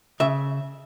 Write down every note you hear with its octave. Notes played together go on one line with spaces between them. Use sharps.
C#3 E5